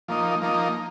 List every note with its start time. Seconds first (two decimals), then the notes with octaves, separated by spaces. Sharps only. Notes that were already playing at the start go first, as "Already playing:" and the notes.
0.08 F3 A#3 D#4
0.42 F3 A#3 D#4